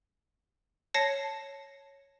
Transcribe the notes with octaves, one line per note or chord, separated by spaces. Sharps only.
C#5 A5 A#6 C7 C#7